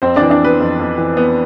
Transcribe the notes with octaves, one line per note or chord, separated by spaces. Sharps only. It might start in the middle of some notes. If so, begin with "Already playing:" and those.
F2 C4 C5
D4 D5
E3
D4 D5
B3 B4
F2
F2
E3
B3